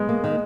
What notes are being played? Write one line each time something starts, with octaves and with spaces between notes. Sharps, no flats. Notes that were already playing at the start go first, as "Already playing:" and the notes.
Already playing: G#3 B3
A#3
D#3